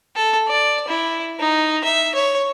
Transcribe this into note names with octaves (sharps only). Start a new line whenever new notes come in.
A4
D5
E4
D#4
E5
C#5